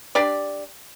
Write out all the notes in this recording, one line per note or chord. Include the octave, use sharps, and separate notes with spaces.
D4 G4 D5